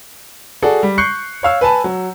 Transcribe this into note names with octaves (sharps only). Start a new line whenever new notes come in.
F#4 G#4 A4 D5 F#5
G3
C#6 F#6 G6 C7 C#7
C#5 F5 E6
B4 G#5 A5 B5
F#3